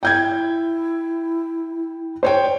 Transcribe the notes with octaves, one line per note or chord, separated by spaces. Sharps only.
E4 G5 G6 G#6
C5 C#5 G5